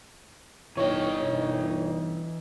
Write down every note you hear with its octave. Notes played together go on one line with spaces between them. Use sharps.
G1 E3 D#4 C#5 D#5